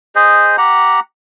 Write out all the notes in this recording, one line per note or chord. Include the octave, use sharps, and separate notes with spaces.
G#4 C5 D#5
G4 F#5 A#5